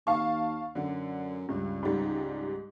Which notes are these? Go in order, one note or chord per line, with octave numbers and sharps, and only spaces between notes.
D#2 F5 A5 C#6
F#2 D3
C#2 G2
G#2 G3